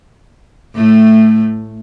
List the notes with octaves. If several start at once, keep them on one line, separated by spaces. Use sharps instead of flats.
A2 A3